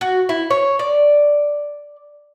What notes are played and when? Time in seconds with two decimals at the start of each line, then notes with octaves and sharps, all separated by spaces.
0.01 F#4
0.29 E4
0.51 C#5
0.79 D5